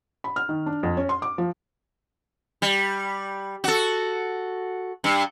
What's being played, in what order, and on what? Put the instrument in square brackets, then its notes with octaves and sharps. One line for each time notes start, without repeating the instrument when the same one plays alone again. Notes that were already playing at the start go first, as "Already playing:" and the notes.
[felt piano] B5
F6
D#3
D4
F2
C#4
C6
D6
F3
[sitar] G3
F#4 A4
G2